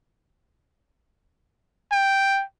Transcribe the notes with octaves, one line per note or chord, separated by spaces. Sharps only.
G5